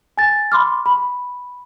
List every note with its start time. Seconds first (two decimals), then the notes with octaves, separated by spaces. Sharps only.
0.17 G#5 A6
0.52 B5 C6 D6 F6
0.86 B5